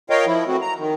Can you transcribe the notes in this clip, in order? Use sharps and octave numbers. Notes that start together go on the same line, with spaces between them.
F4 A#4 C#5 D#5 F5 G5
F3 E4
A3 C4 F#4
A#5
D#3